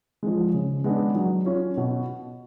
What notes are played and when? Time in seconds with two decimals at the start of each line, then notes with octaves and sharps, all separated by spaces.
0.23 F3 G#3
0.54 C#3
0.84 G#3 B3 D4
1.15 F#3
1.46 C#4 F4
1.77 B2